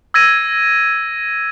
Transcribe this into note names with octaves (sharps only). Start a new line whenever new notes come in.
E6 G#6 A#6 D#7